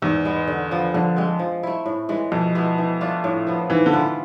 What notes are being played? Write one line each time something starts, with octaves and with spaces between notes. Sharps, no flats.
E2 G#2
G#3 B3
D3
F3 B3
F2 D3
G#3 C4
F3
A3 E4
A2
E3 G#3
F2 B2
G#3 B3 E4
E3
A3 D4 F4
A2
F3 B3
G#2 E3
D3
E3 B3 F4